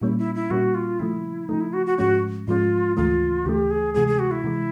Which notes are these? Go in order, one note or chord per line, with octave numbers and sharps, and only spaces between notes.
A#2 G3 A#3 C#4 E4
E4
E4
A#2 G3 A#3 C#4 F#4
F4
C#3 F3 A3 E4
C#3 F3 A3 D#4
E4
F#4
F#4
G#2 F3 G#3 C#4 F#4
G#2 F3 G#3 C#4 F4
D2 C#3 E3 A3 F4
D2 C#3 E3 A3 G4
G#4
C3 E3 G#3 G#4
G#4
F#4
E4
C3 E3 G#3